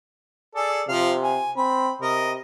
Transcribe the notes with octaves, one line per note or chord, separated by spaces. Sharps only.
G#4 A4 D5
C3 F3 F5
G#5
C4 B5
C3 A#4 D#5